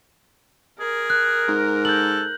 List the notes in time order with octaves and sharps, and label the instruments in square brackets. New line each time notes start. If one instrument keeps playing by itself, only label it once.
[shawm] G#4 [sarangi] A#4
[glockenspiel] F#6
[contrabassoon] G#2
[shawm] A4 [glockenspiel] G6 F#7